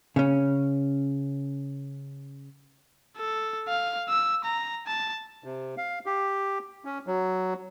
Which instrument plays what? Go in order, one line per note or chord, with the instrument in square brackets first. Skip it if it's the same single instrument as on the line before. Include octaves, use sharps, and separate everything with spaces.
[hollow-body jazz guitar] C#3 C#4
[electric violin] A4
F5
E6
A#5
A5
[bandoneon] C3
F5
G4
C#4
F#3